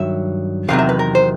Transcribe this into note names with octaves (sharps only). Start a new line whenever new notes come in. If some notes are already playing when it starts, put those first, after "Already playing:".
Already playing: G2 D#3 F#3 E5
E2 C3 D#3 F#3 F5
E5
B4
A#4
C5